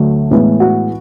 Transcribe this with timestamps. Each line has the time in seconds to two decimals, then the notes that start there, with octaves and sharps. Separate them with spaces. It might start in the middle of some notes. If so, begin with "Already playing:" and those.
Already playing: D2 D3 F#3 A3
0.31 A2 E3 G#3 B3
0.60 F#4